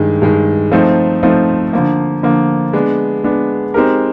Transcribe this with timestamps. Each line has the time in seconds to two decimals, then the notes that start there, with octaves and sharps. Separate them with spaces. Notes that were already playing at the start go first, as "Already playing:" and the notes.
Already playing: G2 D#3 G#3
0.22 G2 D#3 G#3
0.72 F3 A3 C4 D#4
1.23 F3 A3 C4 D#4
1.73 D3 F3 A#3
2.23 D3 F3 A#3
2.73 G#3 B3 D4
3.24 G#3 B3 D4
3.74 G#3 C4 D#4 G4 A#4